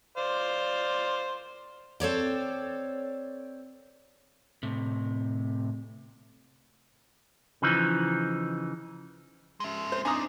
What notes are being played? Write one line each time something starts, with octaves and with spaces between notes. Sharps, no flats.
C5 D5 F5
C4 A4 C#5 D5
A2 C3
C#3 E3 F3 D#4
G#3 E5
C5
D4 D#4 G#5 A#5 D#6